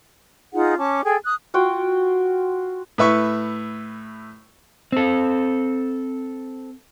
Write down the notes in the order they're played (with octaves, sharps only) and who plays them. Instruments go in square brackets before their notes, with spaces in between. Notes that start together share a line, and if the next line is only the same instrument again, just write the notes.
[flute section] D#4 F4 G#4 F#5
C#4 A5 D6
G#4 A4 G5
D#6 F#6
[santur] F4 F#4 G5
[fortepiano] A2 B4 E5 C#6
[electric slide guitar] C4 A4